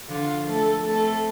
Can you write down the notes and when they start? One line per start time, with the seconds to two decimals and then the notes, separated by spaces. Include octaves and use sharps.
0.09 D3 F3 F4
0.47 F3 A3 A4
0.85 A3 C4 A4